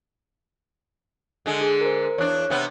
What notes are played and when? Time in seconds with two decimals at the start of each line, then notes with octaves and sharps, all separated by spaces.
1.46 D3 G#3
1.61 G#4
1.81 A#4 C5
2.18 E2 D4 C#5 F#6
2.50 C3 B3